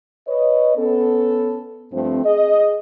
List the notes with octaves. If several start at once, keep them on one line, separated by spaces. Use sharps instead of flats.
B4 C#5 D#5
B3 C#4 A4
G2 F3 A3 C4
G#4 D#5